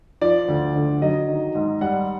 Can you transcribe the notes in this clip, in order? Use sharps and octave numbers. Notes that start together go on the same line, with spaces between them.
F3 D5
D2
D3
F#3 D#5
D#3
G#2
G3 F#5